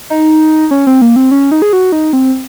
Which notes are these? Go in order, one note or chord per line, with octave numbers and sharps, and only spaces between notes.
D#4
C#4
C4
A#3
C4
C#4
D#4
G#4
F#4
D#4
C4